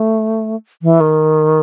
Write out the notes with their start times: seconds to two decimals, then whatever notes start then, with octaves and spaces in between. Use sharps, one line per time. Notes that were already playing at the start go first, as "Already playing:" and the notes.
Already playing: A3
0.82 E3
1.00 D#3